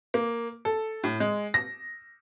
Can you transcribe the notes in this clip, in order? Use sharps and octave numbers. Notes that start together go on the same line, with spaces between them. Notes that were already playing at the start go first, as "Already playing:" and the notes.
A#3
A4
A2
G#3
A#6